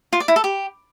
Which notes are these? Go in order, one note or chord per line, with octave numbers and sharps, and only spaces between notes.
F4
D5
E4
A4
G4